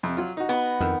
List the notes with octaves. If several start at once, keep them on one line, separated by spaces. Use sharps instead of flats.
F2 C3
F#3 F4
D#4 F#4
B3
F2 D#3